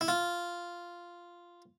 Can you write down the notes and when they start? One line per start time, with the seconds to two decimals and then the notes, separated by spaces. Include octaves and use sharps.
0.01 E4
0.08 F4